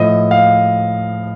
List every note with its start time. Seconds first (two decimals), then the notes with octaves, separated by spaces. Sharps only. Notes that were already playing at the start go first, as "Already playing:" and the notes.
Already playing: A2 F3 D#5
0.31 F5